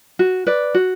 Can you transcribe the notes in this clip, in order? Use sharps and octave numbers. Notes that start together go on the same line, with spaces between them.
F#4
B4 D5
F#4